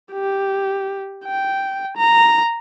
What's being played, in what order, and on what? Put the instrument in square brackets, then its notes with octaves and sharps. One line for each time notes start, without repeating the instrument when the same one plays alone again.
[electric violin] G4
G5
A#5